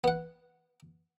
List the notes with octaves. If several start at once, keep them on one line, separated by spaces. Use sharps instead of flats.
B3 F#5